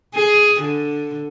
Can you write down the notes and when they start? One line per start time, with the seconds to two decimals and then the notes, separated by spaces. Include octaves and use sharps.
0.14 G#4
0.62 D3